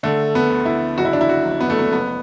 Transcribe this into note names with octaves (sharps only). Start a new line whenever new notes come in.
D3 A3
B3
D2
E4
F#1 F#4
E4
D4
E4
F#4
F#1
B3
A3
B3
F#1 B3